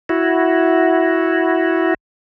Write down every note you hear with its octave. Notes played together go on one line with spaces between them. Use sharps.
E4 F#4